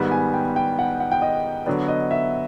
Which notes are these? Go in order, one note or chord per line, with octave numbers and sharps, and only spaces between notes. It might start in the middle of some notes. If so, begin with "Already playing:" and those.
Already playing: G#2 D#3 G3 B3
G#5
G5
G5
F#5
F#5
G5
D#5
D3 F#3 B3 D5
D#5
E5